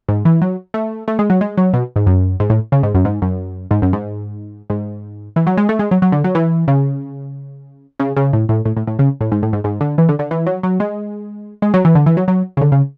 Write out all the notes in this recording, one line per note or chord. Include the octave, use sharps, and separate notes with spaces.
G#2
E3
F#3
A3
A3
G#3
F#3
G#3
F#3
B2
G#2
F#2
G#2
A2
C#3
G#2
F#2
G#2
F#2
G#2
F#2
G#2
G#2
E3
F#3
G#3
A3
G#3
F#3
F#3
D3
F#3
E3
C#3
C#3
C#3
A2
A2
A2
A2
A2
C#3
A2
G#2
A2
G#2
G#2
D3
E3
D3
D3
E3
F#3
F#3
G#3
G#3
F#3
E3
D3
E3
F#3
F#3
C#3
D3
C#3